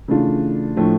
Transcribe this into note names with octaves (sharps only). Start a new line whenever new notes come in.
C#3 E3 A3 D4 F4
A2 F3 A3 D4